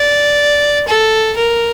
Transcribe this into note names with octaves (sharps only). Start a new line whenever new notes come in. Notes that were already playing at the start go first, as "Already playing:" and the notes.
Already playing: D5
A4
A#4